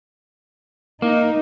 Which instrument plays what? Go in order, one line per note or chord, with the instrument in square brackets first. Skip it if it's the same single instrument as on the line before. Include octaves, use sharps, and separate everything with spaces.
[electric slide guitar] A#3 [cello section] D#4